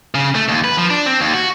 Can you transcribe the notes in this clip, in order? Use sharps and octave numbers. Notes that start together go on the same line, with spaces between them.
C#3
A3
D#2
B4
F3
D4
C4
D#2
F#4